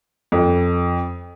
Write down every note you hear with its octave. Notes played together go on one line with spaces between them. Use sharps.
F2